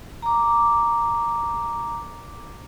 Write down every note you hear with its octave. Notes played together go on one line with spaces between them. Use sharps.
A#5 D6